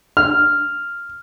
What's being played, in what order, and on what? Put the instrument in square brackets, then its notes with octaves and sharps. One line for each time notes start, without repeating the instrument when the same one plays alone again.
[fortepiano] F6